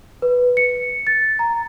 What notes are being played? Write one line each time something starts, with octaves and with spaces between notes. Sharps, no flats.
B4
C#7
A6
A#5